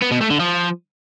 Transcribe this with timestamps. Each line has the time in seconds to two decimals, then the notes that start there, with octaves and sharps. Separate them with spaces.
0.02 B3
0.12 B2
0.21 A3
0.31 D3
0.40 F3